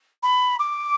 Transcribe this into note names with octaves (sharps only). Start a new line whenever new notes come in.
B5
D6